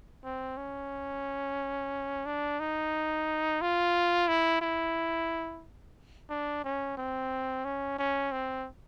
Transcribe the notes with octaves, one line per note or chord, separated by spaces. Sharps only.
C4
C#4
D4
D#4
F4
E4
E4
D4
C#4
C4
C#4
C#4
C4